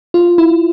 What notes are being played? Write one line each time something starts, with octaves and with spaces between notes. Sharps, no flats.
F4
E4